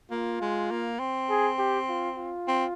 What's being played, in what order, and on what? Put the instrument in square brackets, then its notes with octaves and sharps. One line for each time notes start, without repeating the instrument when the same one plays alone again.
[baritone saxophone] A#3 [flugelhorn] F4
[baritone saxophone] G#3
A#3
C4
[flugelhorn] G#4
G4
F4
F4
[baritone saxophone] C4